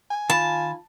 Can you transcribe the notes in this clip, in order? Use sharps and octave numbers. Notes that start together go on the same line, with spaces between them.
G#5
D#3 F4 A5 B5